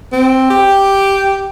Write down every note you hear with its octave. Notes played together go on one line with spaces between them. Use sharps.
C4
G4